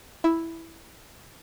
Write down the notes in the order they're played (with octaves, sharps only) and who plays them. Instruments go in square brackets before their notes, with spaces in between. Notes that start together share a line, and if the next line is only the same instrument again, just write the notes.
[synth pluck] E4